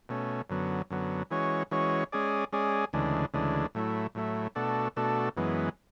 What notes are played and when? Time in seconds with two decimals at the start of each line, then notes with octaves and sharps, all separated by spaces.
0.09 B2 A3 C#4
0.50 F#2 D3 F#3 B3
0.90 F#2 D3 F#3 B3
1.31 E3 G#3 C#4 F#4 C#5
1.71 E3 G#3 C#4 F#4 C#5
2.12 G#3 C#4 G#4 D5
2.53 G#3 C#4 G#4 D5
2.93 D2 C#3 E3 G#3 D4
3.34 D2 C#3 E3 G#3 D4
3.75 A2 F#3 A3 E4
4.15 A2 F#3 A3 E4
4.55 B2 A3 D4 F#4 A4
4.96 B2 A3 D4 F#4 A4
5.37 F#2 E3 G#3 B3